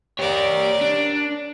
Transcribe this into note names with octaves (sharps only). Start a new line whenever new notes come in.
G4 A#4 C#5 D5
D4